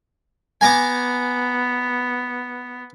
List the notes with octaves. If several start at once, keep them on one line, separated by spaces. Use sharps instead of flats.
B3 G#5 A#5 D6